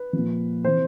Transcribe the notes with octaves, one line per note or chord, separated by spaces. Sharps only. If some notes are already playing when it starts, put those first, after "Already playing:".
Already playing: B4
A#2 F3
C3 E3 C5